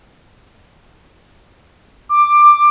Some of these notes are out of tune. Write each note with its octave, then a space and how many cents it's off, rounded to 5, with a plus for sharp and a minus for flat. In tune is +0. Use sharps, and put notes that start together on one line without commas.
D6 +15